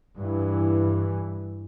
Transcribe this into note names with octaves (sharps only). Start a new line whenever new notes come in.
G2 E3